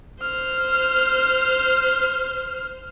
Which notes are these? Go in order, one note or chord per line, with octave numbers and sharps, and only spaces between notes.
C5 F6